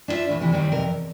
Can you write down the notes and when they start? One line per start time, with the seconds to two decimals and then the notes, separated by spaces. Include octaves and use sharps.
0.08 D4 E4 F4 C5 E5
0.28 E2 A2 E3
0.39 D2 C3 E3
0.52 D#2 D#3 G3 C4
0.72 F2 C3 A#4
0.86 E2